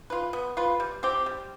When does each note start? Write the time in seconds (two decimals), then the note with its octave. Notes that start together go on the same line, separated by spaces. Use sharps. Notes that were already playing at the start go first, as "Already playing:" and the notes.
0.10 F4 B4
0.33 B3
0.57 F4 B4
0.80 G3
1.03 C4 G4
1.26 G3